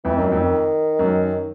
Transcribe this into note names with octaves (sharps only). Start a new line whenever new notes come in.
F2 E3
F#2 D#3
D#3
F2
D#3
F#2